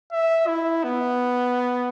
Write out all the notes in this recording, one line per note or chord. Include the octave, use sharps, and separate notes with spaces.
E5
E4
B3